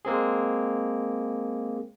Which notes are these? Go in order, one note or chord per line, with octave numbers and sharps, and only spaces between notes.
G#3 A#3 C4 G#4